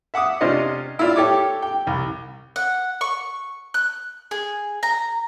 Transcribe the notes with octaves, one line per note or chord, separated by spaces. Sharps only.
E5 F#5 D6 D#6
C3 C#4 D4 F4 C5 D#5
E4 F4 D5
G4 A4 C#5 D6
G5
C2
F#5
C#6
F#6
G#4
A#5